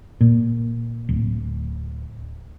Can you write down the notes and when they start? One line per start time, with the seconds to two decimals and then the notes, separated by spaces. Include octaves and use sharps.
0.21 A#2
1.09 D1